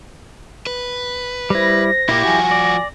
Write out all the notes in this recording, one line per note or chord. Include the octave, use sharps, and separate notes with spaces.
B4
G3 E4 C5 A#6
A#2 A#3 E4 G4
F3 F#4 G#5
D5